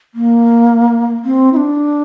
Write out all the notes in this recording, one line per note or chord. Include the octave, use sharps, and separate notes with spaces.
A#3
C4
E4
D4